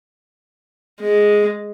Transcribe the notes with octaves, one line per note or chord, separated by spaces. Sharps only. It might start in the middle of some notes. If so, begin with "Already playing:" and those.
G#3